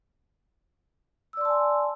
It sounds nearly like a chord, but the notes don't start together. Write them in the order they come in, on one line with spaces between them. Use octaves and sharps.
E6 D5 C6 A5 G#5